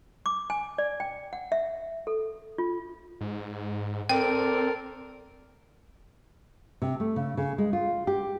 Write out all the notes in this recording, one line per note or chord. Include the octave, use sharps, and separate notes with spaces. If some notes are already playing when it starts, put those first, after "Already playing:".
D6
G#5
D5
G5
F#5
E5
A4
F4
G#2
C4 A4 A#4 D5 G5
C3
A3
C#3
C#3
G#3
F4
G4